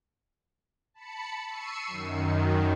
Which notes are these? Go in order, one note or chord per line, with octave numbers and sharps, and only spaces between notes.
A5 B5 C#7
C#6 E6 C7 C#7 D#7
F#2 D#3